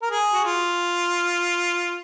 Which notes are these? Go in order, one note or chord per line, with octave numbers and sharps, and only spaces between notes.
A#4
G#4
F#4
F4